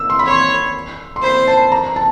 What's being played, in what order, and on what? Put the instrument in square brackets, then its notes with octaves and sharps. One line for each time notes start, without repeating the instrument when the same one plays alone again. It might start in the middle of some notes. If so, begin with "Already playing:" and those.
Already playing: [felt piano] E6
C6
B5
[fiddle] C#5 [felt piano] C6
[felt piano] C6
[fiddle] C5 [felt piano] B5
[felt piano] A5
A#5
A5